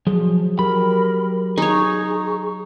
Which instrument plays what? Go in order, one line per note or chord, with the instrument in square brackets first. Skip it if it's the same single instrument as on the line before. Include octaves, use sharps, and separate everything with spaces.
[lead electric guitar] F3 [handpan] F#3 G#4
[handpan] F#3 G4 [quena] A#4 [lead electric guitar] B5
[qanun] D#4 C#5 [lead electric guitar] G#4 [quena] C#6